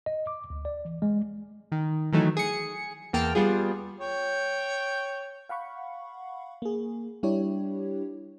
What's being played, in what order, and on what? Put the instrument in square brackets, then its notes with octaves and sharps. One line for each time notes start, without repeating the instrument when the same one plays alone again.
[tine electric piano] D#5
D6
D2
D5
E3
G#3
[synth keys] D#3
D#3 E3 F#3 A3 D#4
G#4 C#7
E2 A#3 G5 A5 F6
G3 B3 F4 G#4
[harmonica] C#5 G5
[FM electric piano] F5 F#5 B5 C#6
A#3 G#4
G3 D4 E4 G4 C#5